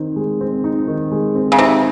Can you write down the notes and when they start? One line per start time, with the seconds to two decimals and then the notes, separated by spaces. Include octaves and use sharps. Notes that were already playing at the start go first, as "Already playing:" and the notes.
Already playing: D#3 C4 D#4
0.16 G#3
0.41 C4
0.64 D#4
0.88 D#3
1.12 G#3
1.35 C4
1.52 C#3
1.59 C3 D#4